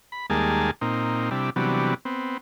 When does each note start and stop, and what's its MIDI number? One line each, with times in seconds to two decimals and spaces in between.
0.12 0.26 83
0.30 0.71 39
0.30 0.71 55
0.30 0.71 56
0.30 0.71 58
0.30 0.71 68
0.30 0.71 81
0.81 1.30 46
0.81 1.30 60
0.81 1.30 63
1.31 1.50 48
1.31 1.50 55
1.31 1.50 62
1.31 1.50 64
1.56 1.94 48
1.56 1.94 52
1.56 1.94 54
1.56 1.94 55
1.56 1.94 59
1.56 1.94 62
2.05 2.38 59
2.05 2.38 60